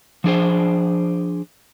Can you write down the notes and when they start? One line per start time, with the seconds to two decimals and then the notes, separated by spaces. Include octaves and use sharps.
0.24 F3 D4 G#4 C5